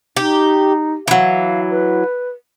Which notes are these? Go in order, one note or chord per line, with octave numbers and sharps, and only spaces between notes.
D#4 G4
E3 F#3 F5
B4